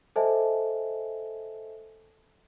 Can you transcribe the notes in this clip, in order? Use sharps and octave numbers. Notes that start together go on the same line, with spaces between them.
A4 C5 D#5 E5 G#5 A5